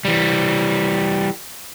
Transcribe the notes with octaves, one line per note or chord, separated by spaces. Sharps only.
E3 G3